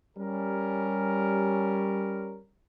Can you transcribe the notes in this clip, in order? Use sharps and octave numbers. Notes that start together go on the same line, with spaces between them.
G3 C#4 A#4